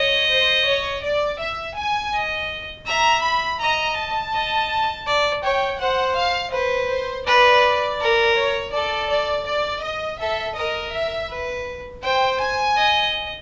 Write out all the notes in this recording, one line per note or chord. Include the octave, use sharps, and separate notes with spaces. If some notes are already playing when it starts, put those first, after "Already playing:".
Already playing: C#5 D#5
C5
C#5
D5
E5
G#5
D#5
E5 A#5
B5
D#5 A#5
A5
D#5
D5
C#5 G5
C5 F#5
F5
B4 C5
C5
B4 D5
A#4
C#5
A4 D5
D5
D5
D#5
A4 E5
A#4 D#5
E5
B4
C5 G5
G#5
D#5